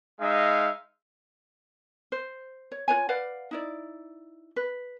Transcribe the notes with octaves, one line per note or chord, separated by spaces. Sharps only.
G#3 D#4 E5 F5
C5
C#5
F4 B4 C#5 G#5
B4 D5 F5 F#5
D#4 E4 D5
B4